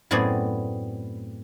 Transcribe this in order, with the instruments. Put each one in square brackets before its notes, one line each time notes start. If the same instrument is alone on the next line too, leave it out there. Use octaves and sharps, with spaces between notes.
[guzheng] F#2 A2 B3 C4 G#4 D5